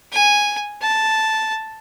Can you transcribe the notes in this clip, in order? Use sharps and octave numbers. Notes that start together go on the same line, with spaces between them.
G#5
A5